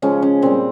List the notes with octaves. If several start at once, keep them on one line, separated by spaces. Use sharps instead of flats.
C#3 F3 G#3 C#4
C#4
A#2 G3 C4